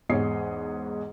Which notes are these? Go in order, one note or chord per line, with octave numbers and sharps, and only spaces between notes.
E2 G#2 G#4 C#5 D#5 C7